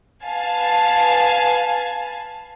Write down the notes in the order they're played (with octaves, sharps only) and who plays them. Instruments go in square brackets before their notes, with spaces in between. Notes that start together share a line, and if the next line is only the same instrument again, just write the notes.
[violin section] B4 F5 G#5 A5